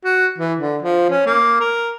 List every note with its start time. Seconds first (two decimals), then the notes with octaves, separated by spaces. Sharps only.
0.04 F#4
0.38 E3
0.59 D3
0.83 F3
1.10 C#4
1.26 A#3
1.60 A#4